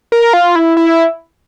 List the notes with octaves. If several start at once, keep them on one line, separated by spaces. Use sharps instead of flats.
A#4
F4
E4
E4